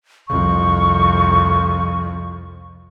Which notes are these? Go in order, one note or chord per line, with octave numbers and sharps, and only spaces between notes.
C2 F2 C#6